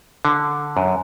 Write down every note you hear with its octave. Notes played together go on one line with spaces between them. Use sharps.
D3
F#2